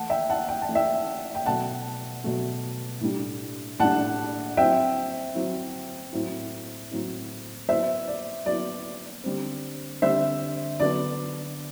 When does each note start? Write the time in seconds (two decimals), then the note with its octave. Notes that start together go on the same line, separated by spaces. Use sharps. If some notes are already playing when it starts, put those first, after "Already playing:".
Already playing: E3 A3 E4 F#5 A5
0.10 E5 G5
0.30 F#5 A5
0.49 G5
0.62 A5
0.68 E3 A3 E4
0.75 E5 G5
1.35 G5
1.46 B2 F#3 A3 F#5 A5
2.24 B2 F#3 A3
3.01 A2 G3 D4
3.80 A2 G3 D4 F#5 A5
4.57 F#3 C4 E4 E5 G5
5.35 F#3 C4 E4
6.13 A2 F#3 C4 E4
6.91 A2 F#3 C4 E4
7.69 F#3 B3 E4 C5 E5
8.08 D5
8.46 F#3 B3 E4 D5
9.24 D3 G3 C4
10.02 D3 G3 C4 C5 E5
10.80 D3 F#3 B3 D4 D5